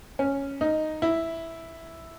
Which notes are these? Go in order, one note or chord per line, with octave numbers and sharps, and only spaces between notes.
C#4
D#4
E4